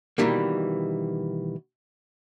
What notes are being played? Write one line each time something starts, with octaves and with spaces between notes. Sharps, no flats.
B2 D#3 E3 G3 A#3